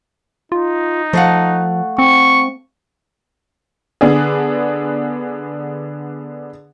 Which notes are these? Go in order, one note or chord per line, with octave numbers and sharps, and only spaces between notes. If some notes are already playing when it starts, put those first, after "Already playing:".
D#4 F4
F3 A3 F5 F#5
C4 C#6
D3 B3 D4 G#4